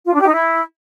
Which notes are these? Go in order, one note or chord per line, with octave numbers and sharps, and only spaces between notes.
F4
D4
G4
D#4
E4